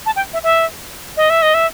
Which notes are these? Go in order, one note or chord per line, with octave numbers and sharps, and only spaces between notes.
A5
G5
E5
E5
D#5
E5
D#5
E5